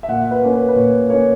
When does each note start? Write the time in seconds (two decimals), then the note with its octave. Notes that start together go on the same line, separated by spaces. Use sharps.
0.03 E5
0.08 A#2 F#5
0.31 B4
0.42 A#3 C#4
0.53 B4
0.68 B4
0.76 A#2 C#5
1.09 A#3 C#4 C#5